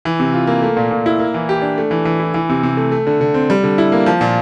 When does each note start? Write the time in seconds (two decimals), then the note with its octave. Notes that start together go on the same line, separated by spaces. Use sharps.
0.05 E3
0.20 C3
0.34 F4
0.47 A#3
0.62 A3
0.77 A#2
0.91 A#2
1.06 E4
1.19 A#3
1.34 E3
1.49 G4
1.62 D4
1.78 A3
1.91 E3
2.05 E3
2.19 E4
2.34 E3
2.49 C3
2.63 C3
2.77 A3
2.92 A3
3.07 D3
3.21 D3
3.34 C4
3.50 G3
3.64 D3
3.78 E4
3.92 A#3
4.06 F3
4.21 A#2